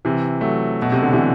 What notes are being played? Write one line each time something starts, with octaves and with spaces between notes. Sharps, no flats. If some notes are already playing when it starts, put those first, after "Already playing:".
C3 E3
F#3 A3
B2
C3
D3
C3 E3